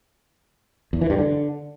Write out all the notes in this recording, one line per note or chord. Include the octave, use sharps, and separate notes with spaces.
E2
E3
G2
D3